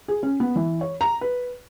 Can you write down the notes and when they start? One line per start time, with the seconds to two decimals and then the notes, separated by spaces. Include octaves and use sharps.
0.08 G#4
0.23 C#4
0.40 B3
0.56 E3
0.81 C#5
1.01 A#5
1.21 B4